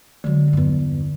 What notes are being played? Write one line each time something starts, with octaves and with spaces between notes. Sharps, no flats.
D3 F#3 G#3
E2 G2